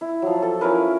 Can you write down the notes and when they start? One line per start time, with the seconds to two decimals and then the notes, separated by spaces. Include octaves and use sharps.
0.01 E4
0.22 F3 F#3
0.42 A4
0.61 C#4 E4 A#4 B4